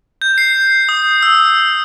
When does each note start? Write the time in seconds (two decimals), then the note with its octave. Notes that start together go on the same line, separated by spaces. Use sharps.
0.22 G6
0.38 C7
0.89 D#6
1.22 E6